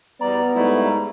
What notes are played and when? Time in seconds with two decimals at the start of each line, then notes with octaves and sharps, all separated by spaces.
0.21 E2 G3 B3 D5 A#5
0.55 G#2 G3 A3 E4